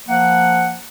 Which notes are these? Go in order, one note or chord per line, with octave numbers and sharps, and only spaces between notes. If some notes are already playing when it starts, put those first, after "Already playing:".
F3 A#3 F#5